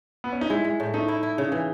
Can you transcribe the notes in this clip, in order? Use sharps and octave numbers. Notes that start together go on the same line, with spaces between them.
B3
C#4
D#4
G#3 E4
G#3
A2
A3 D#4
E4
E4
C#3
E3